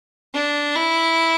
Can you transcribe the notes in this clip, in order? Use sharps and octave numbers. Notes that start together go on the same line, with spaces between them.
D4
E4